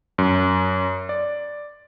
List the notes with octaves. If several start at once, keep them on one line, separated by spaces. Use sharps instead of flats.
F#2
D5